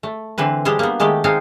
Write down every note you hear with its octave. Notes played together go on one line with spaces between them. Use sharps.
A3
D3 E3 C4 B4
G3 G#3 D4 G4
A#3 B3
D#3 G#3 A3 G4
G#3 C4 D#4 F5